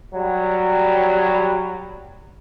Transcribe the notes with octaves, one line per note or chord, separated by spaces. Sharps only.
F#3 G3